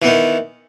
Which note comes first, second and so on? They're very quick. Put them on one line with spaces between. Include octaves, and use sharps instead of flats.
E3 B3 D#3